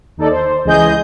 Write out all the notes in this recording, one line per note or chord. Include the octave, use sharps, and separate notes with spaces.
D#2 D#4 A4 D5
C5
C#2 E3 G#4 D#5 G6